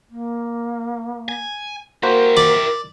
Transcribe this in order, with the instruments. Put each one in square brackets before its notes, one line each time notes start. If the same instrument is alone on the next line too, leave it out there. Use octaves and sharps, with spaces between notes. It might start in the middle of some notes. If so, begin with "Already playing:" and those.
[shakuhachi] A#3
[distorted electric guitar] G#5
[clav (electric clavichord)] A#3 F#4 C5 [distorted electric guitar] E4 G4 [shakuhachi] A#4
[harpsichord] D5